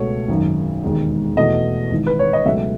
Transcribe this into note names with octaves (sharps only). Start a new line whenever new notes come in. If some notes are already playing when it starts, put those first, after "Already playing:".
Already playing: C#2 B2 A3 C#5
G#1 F#2 D#3
E1 D#2 D#3 G#3
E2 B2 A3 D#5
G#1 G#2 E3
B4
C#5
D#5
C#2 B2 F#3 A3 E5